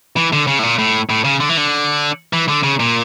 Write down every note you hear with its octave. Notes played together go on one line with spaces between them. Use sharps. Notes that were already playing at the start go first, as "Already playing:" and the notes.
E3
D3
C#3
A2
A#2
A2
A2
C#3
D3
E3
D3
E3
D3
C#3
A#2